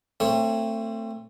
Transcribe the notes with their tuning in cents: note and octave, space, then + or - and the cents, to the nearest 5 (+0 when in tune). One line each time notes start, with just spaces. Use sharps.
A3 +30 C4 +10 C#5 +0